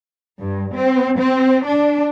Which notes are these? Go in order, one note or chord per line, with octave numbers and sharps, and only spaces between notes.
G2
C4
C4
D4